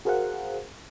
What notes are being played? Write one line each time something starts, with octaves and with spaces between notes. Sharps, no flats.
F#4 G#4 A#4 C5 F5 F#5